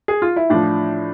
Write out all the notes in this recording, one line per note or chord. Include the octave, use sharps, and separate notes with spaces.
G#4
F4
E4
A2 F3 D4